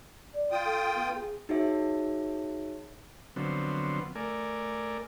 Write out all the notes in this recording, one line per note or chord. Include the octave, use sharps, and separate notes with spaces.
D5
F4 G5 D#6
A4
B3
G#4
D#4 F#4 G#4 C#5 E5
D3 F3 F#3 B3 C4
A3 A#4 D5 G#5